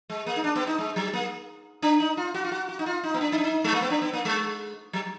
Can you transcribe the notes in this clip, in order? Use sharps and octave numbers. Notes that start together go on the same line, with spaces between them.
G#3
A#3
D#4
D4
B3
D#4
G#3
F#3
A#3
D4
D#4
F4
F#4
F4
F#4
F#4
D#4
F4
D#4
B3
D4
D#4
D4
D#4
G#3
A#3
B3
D4
B3
A#3
G#3
F#3